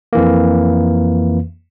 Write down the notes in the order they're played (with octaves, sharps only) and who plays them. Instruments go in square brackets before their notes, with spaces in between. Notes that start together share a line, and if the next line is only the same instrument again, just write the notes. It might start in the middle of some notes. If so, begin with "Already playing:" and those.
[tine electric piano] F2 E3 A#3